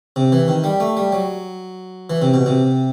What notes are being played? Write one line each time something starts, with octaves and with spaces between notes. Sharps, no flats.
C3
E3
D#3
G3
A3
G3
F#3
E3
C3
B2
C3